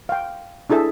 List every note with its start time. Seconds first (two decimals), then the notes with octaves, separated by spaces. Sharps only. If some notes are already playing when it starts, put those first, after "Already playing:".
0.09 F5 G5
0.70 D4 E4 G#4 A4 E5